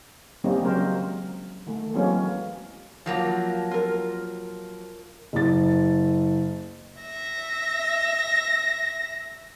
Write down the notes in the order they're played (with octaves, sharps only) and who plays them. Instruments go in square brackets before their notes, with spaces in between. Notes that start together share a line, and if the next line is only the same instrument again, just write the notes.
[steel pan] D#3 G3 A#3 C4 C#4 D#4
C#3 F#3 G#3 C4 A#4 C5
D#3 A3
E3 F#3 G#3 A#3 C4 C#4
[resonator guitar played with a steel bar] F3 F#3 A#3
[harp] F4 A#4
[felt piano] F#1 A6
[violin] E5 A#6